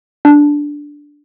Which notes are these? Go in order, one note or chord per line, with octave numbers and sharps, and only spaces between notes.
D4